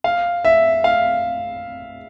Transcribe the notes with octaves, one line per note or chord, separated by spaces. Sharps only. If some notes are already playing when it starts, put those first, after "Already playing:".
F5
E5
F5